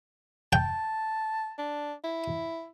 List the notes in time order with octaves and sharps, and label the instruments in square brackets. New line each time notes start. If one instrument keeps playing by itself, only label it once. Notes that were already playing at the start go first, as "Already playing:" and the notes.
[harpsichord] G5 [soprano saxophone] A5
[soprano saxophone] D4
E4